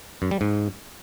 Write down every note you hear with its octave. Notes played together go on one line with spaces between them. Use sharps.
F#2
G3
G#2